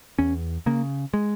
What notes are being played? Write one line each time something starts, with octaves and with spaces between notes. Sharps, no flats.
E2 C#4
C#3 A#3
G#3